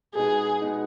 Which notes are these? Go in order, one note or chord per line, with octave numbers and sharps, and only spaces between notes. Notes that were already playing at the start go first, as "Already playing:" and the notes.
B2 G#3 B3 D#4 G#4
B2 G#3 B3 D#4